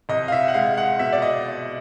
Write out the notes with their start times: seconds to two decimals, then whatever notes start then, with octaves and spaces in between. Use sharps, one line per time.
0.09 C2 D#5
0.28 F5
0.32 E5
0.48 F#5
0.54 G#3 F5
0.77 F#5
0.99 B2 E5
1.12 D5
1.22 D#5